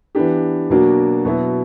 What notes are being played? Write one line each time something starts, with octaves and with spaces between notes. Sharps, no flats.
E3 B3 D4 G4
B2 F#3 A#3 D4 F#4
B2 F#3 B3 E4